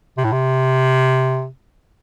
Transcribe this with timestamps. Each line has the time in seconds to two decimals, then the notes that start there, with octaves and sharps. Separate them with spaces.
0.18 C3
0.25 A2
0.32 C3